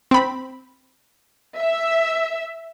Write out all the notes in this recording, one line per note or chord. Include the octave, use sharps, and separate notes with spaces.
C4 B5
E5